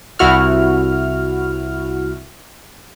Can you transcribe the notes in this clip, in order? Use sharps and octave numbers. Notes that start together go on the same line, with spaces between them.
C2 E4 F#4 F6